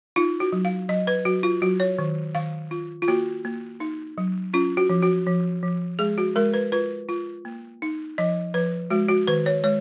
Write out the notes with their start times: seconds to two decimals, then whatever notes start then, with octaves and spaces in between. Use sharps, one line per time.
0.16 D#4 F4
0.40 F#4
0.53 F#3
0.65 F5
0.89 F#3 D#5
1.07 B4
1.25 F#3 F#4
1.43 F4
1.62 F#3 F#4
1.80 C#5
1.99 D#3
2.35 D#3 F5
2.71 F4
3.02 F4
3.08 A#3 F#4
3.45 A#3
3.80 D#4
4.18 F#3
4.54 C#4 F4
4.77 F#4
4.90 F3
5.02 F#4
5.27 F3
5.63 F3
5.99 G#3 G#4
6.18 F#4
6.36 G#3 A#4
6.54 B4
6.72 F4 B4
7.09 F4
7.45 A#3
7.82 D#4
8.18 F3 D#5
8.54 F3 B4
8.90 G#3 F#4
9.09 F#4
9.27 D#3 B4
9.46 C#5
9.64 G#3 C#5